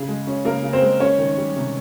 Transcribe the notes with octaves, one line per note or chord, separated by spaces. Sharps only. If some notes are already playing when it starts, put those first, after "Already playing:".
Already playing: C#3 G#4
G#3
C#4
C#3 A#3 A#4
C#3
C4 C5
G#3
C#4 C#5
D#3
G3
C3